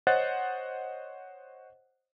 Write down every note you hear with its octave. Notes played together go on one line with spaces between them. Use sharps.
C5 C#5 D#5 F#5 F#6 A6